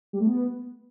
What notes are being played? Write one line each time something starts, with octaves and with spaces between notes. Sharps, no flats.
G3
A3
B3